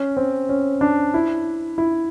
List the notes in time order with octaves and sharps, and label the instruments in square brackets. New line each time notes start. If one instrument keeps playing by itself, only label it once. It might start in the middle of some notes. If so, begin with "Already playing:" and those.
Already playing: [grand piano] C#4
C4
C#4
D4
E4
E4